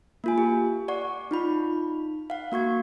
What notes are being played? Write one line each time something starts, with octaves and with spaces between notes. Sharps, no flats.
A#3 F4 G#5
G4
D5 F#5 C#6
D#4 F4 B5
F5 F#5
A#3 F#4 C#6 G#6